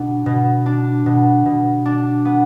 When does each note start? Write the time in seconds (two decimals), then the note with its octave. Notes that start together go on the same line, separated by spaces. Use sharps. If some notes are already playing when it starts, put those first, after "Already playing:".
Already playing: B2 D4
0.26 B2
0.66 D4
1.06 B2
1.46 B2
1.86 D4
2.25 B3